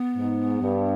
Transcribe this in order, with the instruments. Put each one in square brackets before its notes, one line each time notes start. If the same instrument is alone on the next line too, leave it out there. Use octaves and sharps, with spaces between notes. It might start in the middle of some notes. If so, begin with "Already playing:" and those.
Already playing: [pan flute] B3
[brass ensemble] G#2
G2